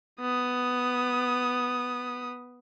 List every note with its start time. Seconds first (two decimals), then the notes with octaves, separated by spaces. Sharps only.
0.21 B3 D#6